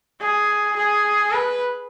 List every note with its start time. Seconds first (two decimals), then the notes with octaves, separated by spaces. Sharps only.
0.21 G#4
0.77 G#4
1.33 B4